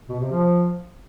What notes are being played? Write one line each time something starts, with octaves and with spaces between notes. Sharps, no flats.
B2
C3
F3